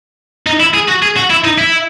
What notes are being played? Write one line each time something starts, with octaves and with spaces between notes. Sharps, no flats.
D#4
E4
G#4
F#4
G#4
F#4
E4
D#4
E4